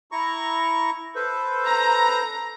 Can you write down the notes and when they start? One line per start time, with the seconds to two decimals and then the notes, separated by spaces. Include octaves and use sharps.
0.12 E4 A#5 C#6
1.16 A4 B4 C5
1.66 A#5